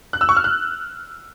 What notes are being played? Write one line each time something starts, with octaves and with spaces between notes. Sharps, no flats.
F#6
E6
C#6
F6
F#6